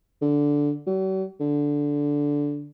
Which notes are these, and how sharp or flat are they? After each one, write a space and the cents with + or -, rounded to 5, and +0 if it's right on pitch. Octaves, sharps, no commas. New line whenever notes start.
D3 -10
F#3 +45
D3 -10